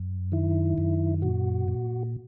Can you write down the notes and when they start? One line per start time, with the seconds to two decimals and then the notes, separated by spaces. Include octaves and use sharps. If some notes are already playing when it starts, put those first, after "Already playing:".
Already playing: F#2
0.32 D#3 E4
0.78 F#2
1.22 A#2 F#4
1.68 A#2